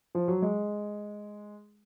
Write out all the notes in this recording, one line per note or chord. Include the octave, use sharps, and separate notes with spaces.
F3
F#3
G#3